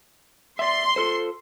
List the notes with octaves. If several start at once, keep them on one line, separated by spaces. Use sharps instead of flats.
D5 E5 C6
F4 A4 C5